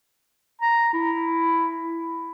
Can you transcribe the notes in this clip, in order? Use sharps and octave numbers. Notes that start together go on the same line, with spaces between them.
A#5
E4